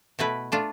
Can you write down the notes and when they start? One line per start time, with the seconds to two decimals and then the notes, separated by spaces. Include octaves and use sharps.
0.19 B2 A3 E4 B4
0.52 A3 D4 F4